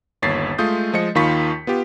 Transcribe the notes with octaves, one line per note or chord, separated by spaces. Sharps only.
G1 D#2 C#5 A6 B6 C7
G#3 A3 F4 D#6 G6
F3 G#3 D#5 C#7
D#2 D#3 F4 B5 C#6 B6
B3 F4 G4